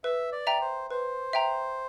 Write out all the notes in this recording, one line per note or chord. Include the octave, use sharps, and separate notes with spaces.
B4 E5
D5
E5 G5 A#5
C5
B4 C5
E5 G5 A#5